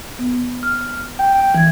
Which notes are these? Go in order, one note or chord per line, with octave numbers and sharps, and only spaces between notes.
B3
F6
G5
E3 G#6